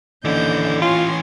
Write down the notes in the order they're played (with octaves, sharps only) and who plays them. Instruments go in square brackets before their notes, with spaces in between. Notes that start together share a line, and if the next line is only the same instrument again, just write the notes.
[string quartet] D#2 D#5 G6 [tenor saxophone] D3 [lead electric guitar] E3 C#4
[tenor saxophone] F4 [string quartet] C#5 G#5 C6